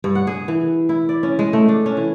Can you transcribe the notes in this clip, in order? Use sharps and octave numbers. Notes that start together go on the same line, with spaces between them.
G2
F#5
G#4
E3
E4
D5
C#4
G#3
A3
D4
C#4
E3